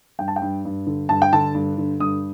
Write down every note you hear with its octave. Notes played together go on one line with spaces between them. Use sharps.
G2 G5
A5
G5
G2
G2
D3
G2 A5
G5
D3 A5
G2
D3
G2 D#6